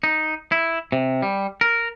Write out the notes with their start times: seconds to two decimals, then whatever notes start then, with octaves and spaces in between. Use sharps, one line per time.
0.04 D#4
0.52 E4
0.92 C3
1.22 G3
1.61 A#4